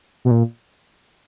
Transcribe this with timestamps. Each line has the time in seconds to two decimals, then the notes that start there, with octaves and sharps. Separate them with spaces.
0.25 B2
0.31 A#2